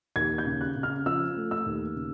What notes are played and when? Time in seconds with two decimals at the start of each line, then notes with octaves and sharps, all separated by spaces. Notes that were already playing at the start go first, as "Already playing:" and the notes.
0.16 D#2 G#6
0.38 G6
0.46 C#3
0.61 F#6
0.76 C#3
0.83 F6
1.06 F3 E6
1.36 A3
1.51 E6
1.66 D#2
1.96 C#3